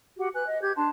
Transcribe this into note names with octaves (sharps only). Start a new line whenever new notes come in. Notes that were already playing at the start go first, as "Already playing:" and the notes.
F#4 G4 F#5
B4 G#5 F#6
D#5
G4 G6 G#6
D4 A5 C6